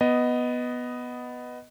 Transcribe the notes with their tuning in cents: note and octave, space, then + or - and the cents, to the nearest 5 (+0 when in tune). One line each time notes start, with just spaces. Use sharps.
B3 +0 D#5 +0